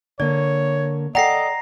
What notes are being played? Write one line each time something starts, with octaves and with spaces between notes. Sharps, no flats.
D3 A#3 C#5 D5
A4 D5 D#5 F#5 G5 A#5 A#6 C7